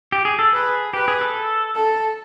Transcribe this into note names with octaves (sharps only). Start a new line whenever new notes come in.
G4
G#4
A4
G#4 B4
G4 B4
G#4
A4
A4